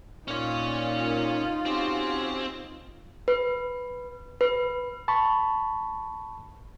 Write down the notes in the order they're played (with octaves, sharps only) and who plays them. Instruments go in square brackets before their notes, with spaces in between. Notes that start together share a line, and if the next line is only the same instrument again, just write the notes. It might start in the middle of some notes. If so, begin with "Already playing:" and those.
[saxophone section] A#2 [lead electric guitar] C#4 C#5 [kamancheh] D#4 F4
[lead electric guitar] C4 [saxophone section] C#4 F#4 G4
[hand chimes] B4
B4
[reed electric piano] A5 B5 C#6